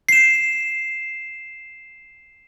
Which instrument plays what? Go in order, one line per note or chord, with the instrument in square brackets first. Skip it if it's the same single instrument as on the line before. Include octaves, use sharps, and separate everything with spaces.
[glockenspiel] C7 E7